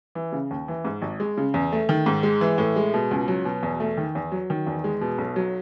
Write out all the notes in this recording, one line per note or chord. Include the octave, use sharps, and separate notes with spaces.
E3
C#3
D#2
E3
G#2
G#1
G#3
C#3
E2
A3
D#3
G#2
G#3
E3
A2
G#3
B2
C#2
F#3
B2
E2
A3
D#3
E2
F#3
D#3
E2
G#3
B2
B1
F#3